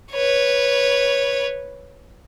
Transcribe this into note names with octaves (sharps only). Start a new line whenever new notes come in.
B4 C#5